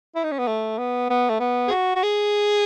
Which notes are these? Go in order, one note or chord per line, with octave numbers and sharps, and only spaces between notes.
E4
D#4
C#4
B3
A3
B3
B3
A3
B3
G#4
F#4
F#4
G#4